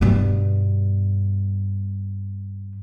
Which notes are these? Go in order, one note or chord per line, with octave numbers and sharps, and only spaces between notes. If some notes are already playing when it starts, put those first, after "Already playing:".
G2 B2